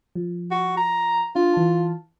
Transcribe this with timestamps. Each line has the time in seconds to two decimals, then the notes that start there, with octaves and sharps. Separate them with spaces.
0.15 F3
0.51 F#4
0.77 A#5
1.36 D4 F4
1.54 E3 A5